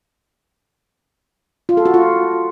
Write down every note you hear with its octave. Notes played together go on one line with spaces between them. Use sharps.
F4
A4
F#4
F4